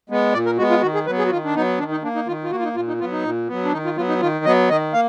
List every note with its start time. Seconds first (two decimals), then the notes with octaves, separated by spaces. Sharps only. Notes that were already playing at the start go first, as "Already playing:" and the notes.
0.10 G#3 B3
0.33 A#2 D5
0.46 A#4
0.58 G#3 B3 F#4
0.70 F4
0.82 D#3 F#4
0.94 G#4
1.06 F#3 B3 B4
1.18 G#4
1.26 F#4
1.30 D#3 F4
1.45 D4
1.55 F#3 B3 D#4
1.79 D#3 D4
1.91 D#4
2.03 A#3 D4
2.15 D#4
2.27 D#3 F4
2.44 F4
2.51 A#3 F#4
2.59 F4
2.64 D#4
2.76 A#2 F4
2.88 D#4
3.00 B3 F4
3.03 F#3
3.12 D#4
3.24 A#2
3.48 F#3 B3
3.65 D4
3.73 D#3 D#4
3.85 F4
3.97 F#3 B3 F4
4.09 D#4
4.20 D#3 F4
4.45 F#3 B3 D#5
4.69 D#3 D#5
4.93 A#3 F5